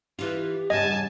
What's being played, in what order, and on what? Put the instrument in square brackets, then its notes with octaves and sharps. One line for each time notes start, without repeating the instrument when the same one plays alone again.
[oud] E3 F4 [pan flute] G4
[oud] E2 G2 C#3 [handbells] D#5 [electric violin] G#5 A5